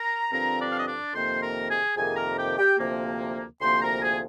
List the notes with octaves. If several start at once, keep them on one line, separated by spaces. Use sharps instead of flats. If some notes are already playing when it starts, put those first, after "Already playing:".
Already playing: A#4 A#5
G2 D3 F3 C4 A#4 A#5
D4 D5
F5
D#5
D4 D5
F2 C3 D#3 A#3 C5 C6
A#4 A#5
G#4 G#5
F2 C3 D#3 A#3 G#4 G#5
A#4 A#5
G4 G5
G4 G5
D2 C3 F3 A#3
D2 C3 F3 A#3 C5 C6
A#4 A#5
G#4 G#5